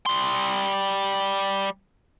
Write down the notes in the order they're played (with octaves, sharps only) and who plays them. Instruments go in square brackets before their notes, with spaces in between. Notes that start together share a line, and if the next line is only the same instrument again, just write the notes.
[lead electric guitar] G3 C6